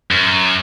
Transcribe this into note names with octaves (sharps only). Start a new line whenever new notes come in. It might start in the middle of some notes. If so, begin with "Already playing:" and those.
F#2